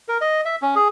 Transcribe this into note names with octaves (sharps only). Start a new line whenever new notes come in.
A#4
D#5
E5
C#4
G#4